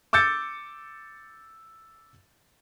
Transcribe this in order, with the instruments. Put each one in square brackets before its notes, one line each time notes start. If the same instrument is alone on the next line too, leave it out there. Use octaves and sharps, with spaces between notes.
[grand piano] D6 E6 G6 A6 C#7